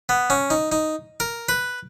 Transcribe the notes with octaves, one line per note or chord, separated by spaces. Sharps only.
B3
C#4
D#4
D#4
A#4
B4